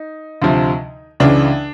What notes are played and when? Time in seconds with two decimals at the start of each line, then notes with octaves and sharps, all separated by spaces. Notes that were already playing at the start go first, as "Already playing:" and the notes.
Already playing: D#4
0.42 D2 C3 F3
1.20 C#2 C#3 E3 D4